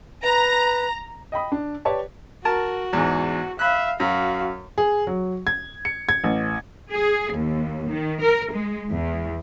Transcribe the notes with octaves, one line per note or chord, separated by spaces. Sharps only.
B4 A#5
D#5 G5 B5 D#6
D4
G4 B4 C#5 D5 A5
F#4 A#4 A5
E2 G#2
E5 F5 B5 F#6
F#2 F#4 F5
G#4
F#3
G#6
C#7
G#6
A1
G#4
D#2
D#3
A#4
G#3
E2